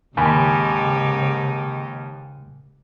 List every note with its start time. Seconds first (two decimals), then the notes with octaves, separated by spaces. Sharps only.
0.17 D#2 G#2 C#3 D#4 G4 G#5 B5